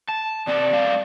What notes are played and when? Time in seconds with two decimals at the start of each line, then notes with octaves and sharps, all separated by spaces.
0.09 A5
0.47 C3 C4 D5 A5
0.73 G3 A3 F5